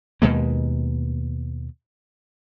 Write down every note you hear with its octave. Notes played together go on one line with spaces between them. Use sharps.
D#2 B2 G#3 A#3